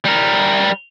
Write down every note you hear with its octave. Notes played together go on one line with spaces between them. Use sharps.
G3 A#4